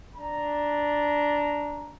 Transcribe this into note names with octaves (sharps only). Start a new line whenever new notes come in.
D4 A#5